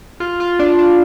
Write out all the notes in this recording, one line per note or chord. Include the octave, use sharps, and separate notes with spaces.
F4
F4
D4
D4